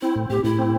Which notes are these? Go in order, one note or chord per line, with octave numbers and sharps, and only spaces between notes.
C4 E4
A2
A2 G4
A2 E4
C4